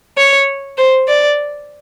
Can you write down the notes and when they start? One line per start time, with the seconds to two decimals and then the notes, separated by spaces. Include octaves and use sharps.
0.17 C#5
0.78 C5
1.08 D5